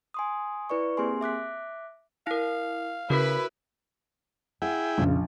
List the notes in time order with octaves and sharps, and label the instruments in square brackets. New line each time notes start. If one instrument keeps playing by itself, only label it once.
[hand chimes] G#5 C6 D#6
E4 B4 D5 C#6
A#3 C4 G4 G#4 G#5 C6
E5 D6 F#6 B6
[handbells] E4 A#4 [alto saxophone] F5
[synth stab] C#3 [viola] E4 B4 [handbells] F#4 A#4 B6
[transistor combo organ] E4 G#4 G5 [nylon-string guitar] F#5
[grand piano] A#1 [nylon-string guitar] F2 C#3